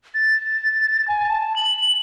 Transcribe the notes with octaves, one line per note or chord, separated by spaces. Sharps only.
A6
G#5
A5
F#7